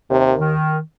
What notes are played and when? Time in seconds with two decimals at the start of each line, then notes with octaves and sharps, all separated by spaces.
0.10 D#2 C3
0.37 D#3